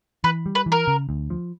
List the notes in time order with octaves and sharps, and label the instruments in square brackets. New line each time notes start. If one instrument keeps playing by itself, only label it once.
[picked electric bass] E3 [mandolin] B4
[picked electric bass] G3
[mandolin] B4
[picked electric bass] E3
[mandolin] A#4
[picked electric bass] C#3
D2
F3